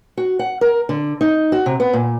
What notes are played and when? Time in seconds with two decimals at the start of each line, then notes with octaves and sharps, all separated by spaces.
0.17 F#4
0.39 F#5
0.61 A#4
0.89 D3
1.21 D#4
1.52 F#4
1.66 C3
1.80 B3
1.93 A#2